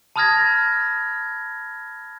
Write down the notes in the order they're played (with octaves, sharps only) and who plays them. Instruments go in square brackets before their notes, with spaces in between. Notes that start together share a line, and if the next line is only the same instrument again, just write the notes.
[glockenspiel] A5 B5 D#6 F6 G#6 A#6